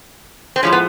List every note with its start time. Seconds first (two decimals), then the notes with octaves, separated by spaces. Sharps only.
0.56 C4
0.63 A2 F3 G#3 C#4
0.72 B3